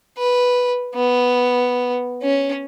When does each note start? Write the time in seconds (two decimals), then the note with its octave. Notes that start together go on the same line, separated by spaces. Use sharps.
0.18 B4
0.95 B3
2.23 C#4